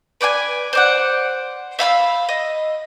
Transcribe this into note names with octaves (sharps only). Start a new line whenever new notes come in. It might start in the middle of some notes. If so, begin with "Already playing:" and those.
B4 D5 G5 G#5
C5 D5 F#5
E5 F5 B5 E6
D#5